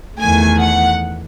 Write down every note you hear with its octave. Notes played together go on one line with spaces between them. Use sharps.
E2 D#3 A3 G#5
F#5